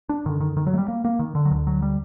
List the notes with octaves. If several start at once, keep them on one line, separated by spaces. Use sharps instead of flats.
D4
F#2 D3 D#3
D#3
D#3
F#3
A3
G3
A#3
A#3
D#3
D3
F#3
D2 D3 D#3
F#3
G3